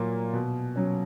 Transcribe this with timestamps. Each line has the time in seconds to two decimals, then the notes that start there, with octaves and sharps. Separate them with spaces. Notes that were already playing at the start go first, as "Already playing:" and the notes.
Already playing: A#2 F#3 A#3
0.33 B2
0.76 F#3 C#4